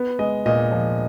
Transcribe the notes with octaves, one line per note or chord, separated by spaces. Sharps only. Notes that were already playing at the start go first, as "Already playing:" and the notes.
Already playing: B3
G#3 D#5
A#2 D#5
F3